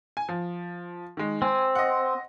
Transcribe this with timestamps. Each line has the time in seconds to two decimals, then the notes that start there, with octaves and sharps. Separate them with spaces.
0.17 G#5
0.29 F3
1.17 D#3 G#3
1.42 C4 G#5
1.75 D#5 F#5